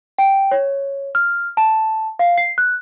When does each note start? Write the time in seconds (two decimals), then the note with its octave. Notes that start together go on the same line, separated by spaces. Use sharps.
0.18 G5
0.51 C#5
1.15 F6
1.57 A5
2.19 F5
2.38 C7
2.58 F#6